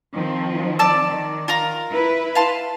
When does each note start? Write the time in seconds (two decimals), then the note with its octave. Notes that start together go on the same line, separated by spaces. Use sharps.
0.12 D#3 F3 C4
0.79 D5 A5 E6
1.09 D#3
1.48 F4 A#4 A#5
1.90 E4 B4
2.35 F5 A5 C6